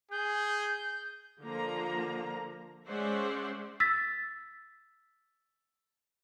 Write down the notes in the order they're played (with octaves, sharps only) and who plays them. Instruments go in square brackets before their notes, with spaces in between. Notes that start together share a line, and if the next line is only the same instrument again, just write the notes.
[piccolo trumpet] G#4 [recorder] G6
[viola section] D3 F3 A#3 A#5
G#3 C#4 C5 D5 E5 F#5
[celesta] E6 A6 B6